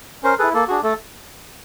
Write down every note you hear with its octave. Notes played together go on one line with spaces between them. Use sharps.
C#4 A#4 C5
E4 G#4 A4 B4
A#3 A4
D4 F#4 G#4
A3 A4